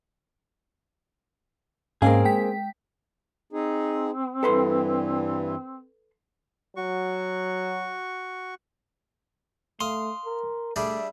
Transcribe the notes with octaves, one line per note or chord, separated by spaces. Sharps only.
G#2 A#3 C4 C#4 G#4 F5
G#3 G5 B6
C4 D#4 G#4
G2 E3 A4 B4 C6
F#3 F#4 C#6
A3 F5 C6 D#6
A#4
G3 A3 D4 G#4 E5